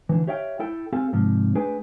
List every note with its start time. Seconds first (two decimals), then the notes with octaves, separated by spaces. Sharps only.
0.09 D3 E3
0.28 G4 C#5 E5 F5 G5
0.59 E4 A4 G5
0.93 C4 G4 A4 F5 G#5
1.13 G#2 C3 F3
1.55 A3 D4 G#4 B4 G5 G#5